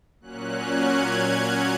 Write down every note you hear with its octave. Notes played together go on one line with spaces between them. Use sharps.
A#2 F#3 C#4 F#6
G#6